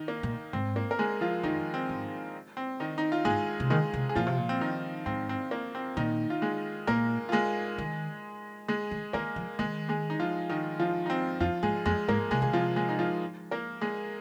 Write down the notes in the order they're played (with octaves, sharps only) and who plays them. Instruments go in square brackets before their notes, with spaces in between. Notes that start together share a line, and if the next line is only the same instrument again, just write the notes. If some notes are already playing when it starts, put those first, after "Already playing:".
Already playing: [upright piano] D#3 D#4
A#3
[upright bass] A#2
[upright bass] G#2 [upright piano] C4
[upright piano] A#3
A#4
G#3 G#4
F3 F4
[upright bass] F2 [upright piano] D#3 D#4
[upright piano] C4
[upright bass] G#2
[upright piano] C4
D#3 D#4
D#4
F4
[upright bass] G#2 [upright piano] G#3 G#4
[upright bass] C3
[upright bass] D#3 [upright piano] G#3 G#4
[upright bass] C3
[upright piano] G#4
[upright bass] A#2 [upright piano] F3 F4
[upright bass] C3
A#2
[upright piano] C4
D#3 D#4
[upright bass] G#2 [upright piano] C4
[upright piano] C4
A#3
C4
[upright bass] A#2 [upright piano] D#3 D#4
[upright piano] F4
G#3 G#4
[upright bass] A#2 [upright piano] A#3 A#4
[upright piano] F4
G#3 G#4
[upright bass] D#3
[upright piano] G#3 G#4
[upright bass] D#3
[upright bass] D#3 [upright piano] A#3 A#4
[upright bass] F3
[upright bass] D#3 [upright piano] G#3 G#4
[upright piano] G#3 G#4
D#4
F3 F4
D#3 D#4
F3 F4
D#4
C4
[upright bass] F2 [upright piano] F3 F4
[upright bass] G#2 [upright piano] G#3 G#4
[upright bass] F2 [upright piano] G#3 G#4
[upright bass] G#2 [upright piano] A#3 A#4
[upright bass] C3 [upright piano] G#3 G#4
[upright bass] D#3 [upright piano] G#4
[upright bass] C3 [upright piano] F3 F4
[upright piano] G#3 G#4
D#4
F3 F4
A#3 A#4
G#3 G#4